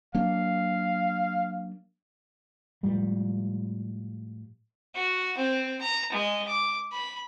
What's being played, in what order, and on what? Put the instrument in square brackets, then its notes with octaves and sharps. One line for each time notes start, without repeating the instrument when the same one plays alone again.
[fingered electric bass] F#3 A#3 D4 [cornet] F5
[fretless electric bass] A2 F3 G3 G#3
[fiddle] F#4
C4
A#5
G#3 D#5
D6
B5